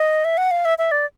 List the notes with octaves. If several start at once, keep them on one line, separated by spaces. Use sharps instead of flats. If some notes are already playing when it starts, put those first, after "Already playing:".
Already playing: D#5
E5
F#5
F5
E5
E5
D5